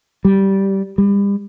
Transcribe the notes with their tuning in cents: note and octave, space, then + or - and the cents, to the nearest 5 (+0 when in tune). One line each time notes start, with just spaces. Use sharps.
G3 -10
G3 +35